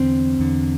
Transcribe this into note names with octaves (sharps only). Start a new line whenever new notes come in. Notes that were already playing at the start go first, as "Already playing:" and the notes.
Already playing: E2 D3 C4
E2 D3